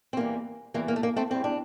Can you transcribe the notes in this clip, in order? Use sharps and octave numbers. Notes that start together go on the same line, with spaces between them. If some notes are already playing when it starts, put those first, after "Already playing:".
C4
E2 E3 G3 A#3
E2 E3 G3 A#3
A#3
A3
A#3
A3 C4
E2 E3 G3 C4
D4